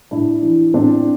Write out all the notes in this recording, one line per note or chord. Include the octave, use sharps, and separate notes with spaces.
A2 D4 E4
E3
A2 C4 D4